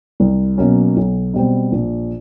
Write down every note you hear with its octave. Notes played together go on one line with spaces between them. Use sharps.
C2
B2 F#3 A#3 C#4
B1
B2 G3 C4
A#1